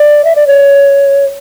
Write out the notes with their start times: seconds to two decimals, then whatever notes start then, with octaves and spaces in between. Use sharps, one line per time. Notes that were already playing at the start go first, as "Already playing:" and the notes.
Already playing: D5
0.25 E5
0.36 D5
0.47 C#5